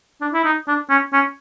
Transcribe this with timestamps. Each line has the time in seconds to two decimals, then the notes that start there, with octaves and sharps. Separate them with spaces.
0.21 D4
0.33 E4
0.45 D#4
0.68 D4
0.90 C#4
1.13 C#4